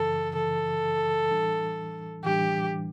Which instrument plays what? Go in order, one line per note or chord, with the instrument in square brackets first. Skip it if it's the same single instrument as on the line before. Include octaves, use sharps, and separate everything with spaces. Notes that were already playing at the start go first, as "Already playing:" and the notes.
Already playing: [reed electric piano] F#2 C#3 E3 [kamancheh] A4
[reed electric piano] F#2 C#3 E3 [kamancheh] A4
[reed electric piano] A2 E3 G3 D4
[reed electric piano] A2 E3 G3 D4 [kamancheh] G4